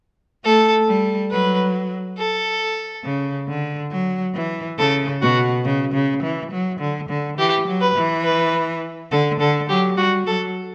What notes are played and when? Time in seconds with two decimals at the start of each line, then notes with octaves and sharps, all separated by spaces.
0.44 A3 A4
0.88 G3
1.31 F#3 B4
2.18 A4
3.04 C#3
3.48 D3
3.91 F#3
4.34 E3
4.78 C#3 A4
5.21 B2 F#4
5.64 C#3
5.93 C#3
6.22 E3
6.51 F#3
6.80 D3
7.09 D3
7.38 E3 G4
7.67 F#3
7.81 B4
7.95 E3
8.24 B4
9.11 D3 A4
9.40 D3 A4
9.69 F#3 G4
9.97 G3 F#4
10.26 F#3 A4